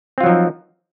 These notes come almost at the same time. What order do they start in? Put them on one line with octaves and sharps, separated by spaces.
C4 F4 F#3 F3 D#4